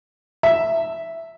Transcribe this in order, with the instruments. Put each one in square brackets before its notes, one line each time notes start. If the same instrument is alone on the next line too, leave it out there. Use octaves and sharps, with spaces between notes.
[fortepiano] E5